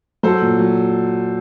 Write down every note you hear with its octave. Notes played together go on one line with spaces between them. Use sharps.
F#3 A4 C5
A#2
F#3